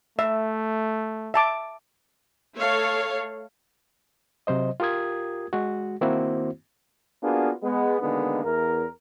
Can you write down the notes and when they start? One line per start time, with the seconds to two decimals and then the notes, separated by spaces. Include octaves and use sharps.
0.19 A3 E5
1.34 E5 A5 D6
2.57 A3 A4 C#5 F5
4.47 C3 F#3 C5 D#5
4.80 F4 G4 A#4 D#6 G#6
5.53 G#3 F#4
6.01 D#3 A#3 C4 E4 F#4 C5
7.23 A#3 B3 D4 F4 F#4 G#4
7.63 G#3 B3
8.01 B2 D3 D#3 G#3 A#3 B3
8.44 E2 A#4